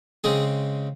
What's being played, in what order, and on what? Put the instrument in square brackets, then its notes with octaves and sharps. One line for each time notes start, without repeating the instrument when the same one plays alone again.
[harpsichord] C#3 G#3 C4 G#4